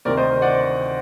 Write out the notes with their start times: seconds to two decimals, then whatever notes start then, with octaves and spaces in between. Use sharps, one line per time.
0.05 D2 C3 D#3 A#4 D5
0.17 C5 D#5
0.42 D5 F#5